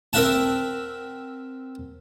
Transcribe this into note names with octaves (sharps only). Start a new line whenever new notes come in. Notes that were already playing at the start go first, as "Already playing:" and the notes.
C4 A#4 E5 F#5 A5